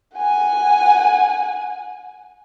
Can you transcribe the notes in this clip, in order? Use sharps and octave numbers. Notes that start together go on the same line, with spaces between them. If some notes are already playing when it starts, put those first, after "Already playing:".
F#5 G#5